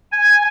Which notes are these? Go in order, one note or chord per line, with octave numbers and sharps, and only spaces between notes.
G#5